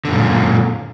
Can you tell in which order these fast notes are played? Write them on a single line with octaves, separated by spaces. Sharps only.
D3 F#2 A#2